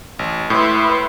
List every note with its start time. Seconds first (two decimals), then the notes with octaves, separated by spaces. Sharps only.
0.19 A1
0.50 A2 B4 E5 C6